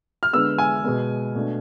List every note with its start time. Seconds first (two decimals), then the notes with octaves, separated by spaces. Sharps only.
0.23 F6
0.33 D3 G#3 B3 E6
0.58 G#5
0.84 B2 G#3 B3
1.35 B2 A3 D4